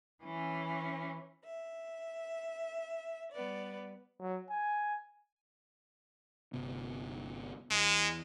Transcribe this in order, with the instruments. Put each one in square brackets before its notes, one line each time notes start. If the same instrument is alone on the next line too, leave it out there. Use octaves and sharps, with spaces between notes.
[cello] E3 C#4
[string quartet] E5
G3 B3 D5
[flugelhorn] F#3
G#5
[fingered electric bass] G1 C3 B3
[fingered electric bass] E2 [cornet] G#3